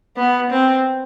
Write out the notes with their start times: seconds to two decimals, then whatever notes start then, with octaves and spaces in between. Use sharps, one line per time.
0.17 B3
0.51 C4